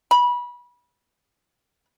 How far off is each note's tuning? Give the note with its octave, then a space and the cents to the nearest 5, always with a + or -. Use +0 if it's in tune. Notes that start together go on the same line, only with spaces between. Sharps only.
B5 -25